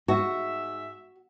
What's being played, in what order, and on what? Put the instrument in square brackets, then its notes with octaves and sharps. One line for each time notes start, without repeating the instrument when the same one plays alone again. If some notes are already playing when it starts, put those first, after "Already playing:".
[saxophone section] G#2 E5 [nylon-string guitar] F#4